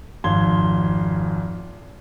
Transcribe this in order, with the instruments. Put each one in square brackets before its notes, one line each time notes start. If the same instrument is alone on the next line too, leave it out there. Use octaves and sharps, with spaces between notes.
[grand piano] G#1 F2 F5 C6 G#6 G7